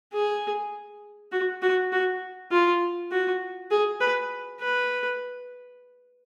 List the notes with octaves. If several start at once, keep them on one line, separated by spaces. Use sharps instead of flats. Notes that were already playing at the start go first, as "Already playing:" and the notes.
G#4
F#4
F#4
F#4
F4
F#4
G#4
B4
B4